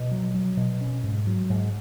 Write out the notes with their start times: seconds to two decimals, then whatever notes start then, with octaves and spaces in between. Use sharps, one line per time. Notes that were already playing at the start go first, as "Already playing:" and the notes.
Already playing: B2
0.11 F#3
0.34 F#3
0.57 B2
0.81 C#4
1.03 G#2
1.27 F#3
1.50 G#2